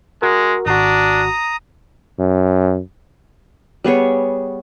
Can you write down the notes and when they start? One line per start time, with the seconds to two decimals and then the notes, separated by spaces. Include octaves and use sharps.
0.22 G#3 F#4 A#4
0.66 G#1 D4 F#4 A#5 D#6
2.19 F#2
3.84 G3 B3 G#4 C#5